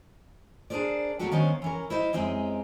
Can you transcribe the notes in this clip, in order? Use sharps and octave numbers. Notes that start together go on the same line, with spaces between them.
D4 G#4 A#4 C5 D5
F#3 G3 A3 C4 F#4 G4
D#3 B3 C#4 D4 C5 F5
E3 C#4 A#4
E4 C5 D#5 F5
F#2 G#3 C4 D#4 G4